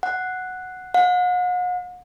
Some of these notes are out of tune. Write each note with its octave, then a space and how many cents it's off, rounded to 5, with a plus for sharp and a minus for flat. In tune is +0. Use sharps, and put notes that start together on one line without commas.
F#5 +0
F#5 -45